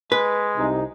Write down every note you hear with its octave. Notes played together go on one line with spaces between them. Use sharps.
G#3 B4
C2 C3 D#4